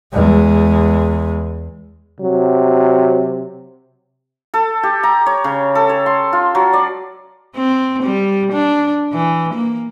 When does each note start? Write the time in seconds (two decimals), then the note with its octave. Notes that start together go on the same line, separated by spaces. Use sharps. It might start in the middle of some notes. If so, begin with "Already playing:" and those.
0.13 E2 G#3
2.21 C3 F#3
4.54 A4
4.83 G4
5.03 A#5
5.26 C#5
5.44 C#3
5.75 A4
5.89 C#5
6.06 C6
6.33 F4
6.55 F#3
6.73 D5
7.57 C4
8.03 G3
8.53 D4
9.13 E3
9.54 A#3